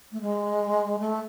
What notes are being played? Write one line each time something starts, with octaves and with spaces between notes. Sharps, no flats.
A3
G#3
A3